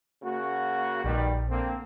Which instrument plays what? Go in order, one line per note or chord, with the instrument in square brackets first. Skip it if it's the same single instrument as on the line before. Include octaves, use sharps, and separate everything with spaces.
[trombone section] C#3 A#3 F#4
[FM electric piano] A#1 [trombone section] B2 D#3 G3
[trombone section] D3 A#3 C4